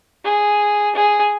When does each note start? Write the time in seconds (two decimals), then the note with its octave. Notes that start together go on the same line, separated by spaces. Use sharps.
0.25 G#4
0.95 G#4